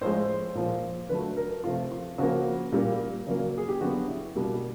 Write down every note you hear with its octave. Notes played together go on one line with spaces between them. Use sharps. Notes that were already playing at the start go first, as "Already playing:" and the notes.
A2 F3 G#3 C5
A#2 F3 A#3
D3 F#3 A3 B4
A#4
C3 F3 A3 F4
F4
C#3 F3 A#3 F#4
A#2 G3 A#3
C#3 F#3 A#3
G#4
G4
D3 F#3 B3 F#4
E4
B2 G3 A#3